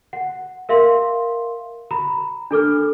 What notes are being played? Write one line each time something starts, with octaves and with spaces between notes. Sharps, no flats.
F#5
A#4 E5 F5 C6
A#5 B5
D4 A4 D6 F6